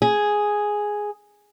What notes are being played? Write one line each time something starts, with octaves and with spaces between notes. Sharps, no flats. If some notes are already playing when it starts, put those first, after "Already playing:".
G#4